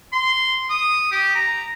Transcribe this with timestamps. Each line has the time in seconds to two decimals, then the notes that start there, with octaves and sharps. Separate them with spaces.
0.13 C6
0.70 D#6
1.12 G4
1.35 A#5